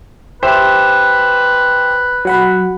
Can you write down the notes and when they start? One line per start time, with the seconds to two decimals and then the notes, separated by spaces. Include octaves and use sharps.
0.43 G4 B4 C5 E5
2.25 F#3 F#5 B5